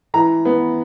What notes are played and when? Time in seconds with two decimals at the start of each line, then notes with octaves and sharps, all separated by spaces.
0.14 E3 A#5
0.45 B3